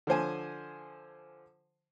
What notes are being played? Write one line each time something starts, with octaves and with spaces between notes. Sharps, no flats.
D3 F3 C5 G#5